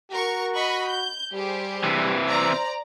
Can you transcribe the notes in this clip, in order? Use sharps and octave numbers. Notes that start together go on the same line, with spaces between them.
F#4 A#4 C#6
D#5 B5 C#6
G6
G3 G4 G#4 C5
C3 E3
C5 D5 A#5